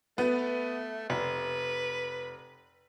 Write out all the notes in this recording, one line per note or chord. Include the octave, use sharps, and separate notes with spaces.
A3 B3
F1 B4